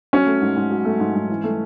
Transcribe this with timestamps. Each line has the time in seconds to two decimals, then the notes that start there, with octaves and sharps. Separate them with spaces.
0.13 F#3 C#4
0.26 A3
0.42 G#2
0.56 G#2
0.71 F#3
0.85 A3
1.00 G#2
1.15 G#2
1.29 E3
1.44 A3